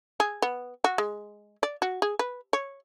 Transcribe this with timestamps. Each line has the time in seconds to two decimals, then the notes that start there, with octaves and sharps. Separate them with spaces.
0.20 G#4
0.42 B3
0.84 F#4
0.98 G#3
1.63 D5
1.82 F#4
2.02 G#4
2.19 B4
2.53 C#5